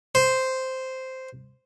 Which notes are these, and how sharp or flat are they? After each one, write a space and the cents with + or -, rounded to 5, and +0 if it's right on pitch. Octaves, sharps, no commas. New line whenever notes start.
C5 -5